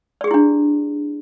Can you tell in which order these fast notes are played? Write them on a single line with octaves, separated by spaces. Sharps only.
D5 G#4 G4 E4 D4